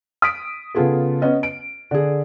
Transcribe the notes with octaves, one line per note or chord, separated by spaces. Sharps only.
D#6 B6 D7
C#3 B3 F4 G#4 A4
B3 C#4 D#5
D7
D3 G#4